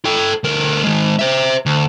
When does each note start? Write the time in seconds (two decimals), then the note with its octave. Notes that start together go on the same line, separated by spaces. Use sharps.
0.05 A4 G5
0.44 D2 A#4
0.84 D#3 G#3
1.19 C5 E5
1.66 D2